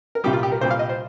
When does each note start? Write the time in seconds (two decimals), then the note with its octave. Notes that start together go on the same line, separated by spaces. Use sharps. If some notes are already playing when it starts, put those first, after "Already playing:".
0.15 A#4
0.24 C2 A#2 G3 G4
0.33 F4
0.43 G4
0.52 A#4
0.61 C2 A#2 G3 C5
0.71 F5
0.79 D#5
0.89 C5